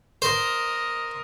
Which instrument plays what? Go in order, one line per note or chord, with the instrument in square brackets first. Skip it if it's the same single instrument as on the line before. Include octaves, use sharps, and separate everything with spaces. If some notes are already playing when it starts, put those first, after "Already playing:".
[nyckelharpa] A#4 D#5 [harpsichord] C5